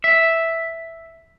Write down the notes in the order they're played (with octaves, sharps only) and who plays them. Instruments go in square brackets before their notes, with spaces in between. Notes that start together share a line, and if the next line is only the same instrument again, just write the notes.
[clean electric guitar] E5